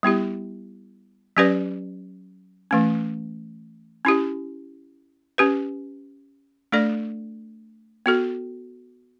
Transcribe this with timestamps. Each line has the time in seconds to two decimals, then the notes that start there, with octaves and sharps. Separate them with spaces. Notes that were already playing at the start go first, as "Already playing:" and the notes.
0.03 G3 B3 E4 G4
1.37 F#3 C#4 G4 B4 D5
2.71 E3 A3 C#4
4.05 C#4 E4 G4
5.38 C#4 G4 B4
6.72 A3 D4 A4 D5
8.06 B3 F#4 A4